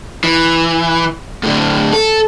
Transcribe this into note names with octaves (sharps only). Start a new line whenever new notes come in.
E3
A2 D3
A4